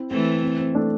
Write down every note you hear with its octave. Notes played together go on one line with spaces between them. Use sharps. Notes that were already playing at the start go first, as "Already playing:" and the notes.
Already playing: C4 E4
E3 A3 C4
C4
C4
A3 D4